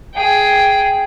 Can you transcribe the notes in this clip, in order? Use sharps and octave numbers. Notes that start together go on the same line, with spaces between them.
G#4 G5